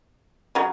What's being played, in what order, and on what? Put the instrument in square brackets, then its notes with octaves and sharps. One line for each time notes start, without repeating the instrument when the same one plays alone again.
[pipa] C#3 F#3